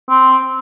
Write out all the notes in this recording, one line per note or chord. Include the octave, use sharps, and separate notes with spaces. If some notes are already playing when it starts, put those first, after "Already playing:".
C4